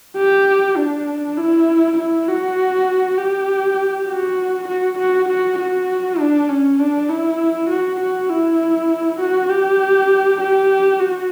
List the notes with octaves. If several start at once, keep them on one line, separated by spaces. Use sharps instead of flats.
G4
D4
E4
E4
F#4
G4
F#4
F#4
F#4
F#4
F#4
D4
C#4
D4
E4
F#4
F#4
E4
F#4
G4
G4
F#4